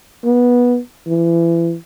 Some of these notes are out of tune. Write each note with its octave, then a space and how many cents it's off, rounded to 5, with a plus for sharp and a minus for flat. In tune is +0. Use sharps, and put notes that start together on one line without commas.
B3 -15
E3 +30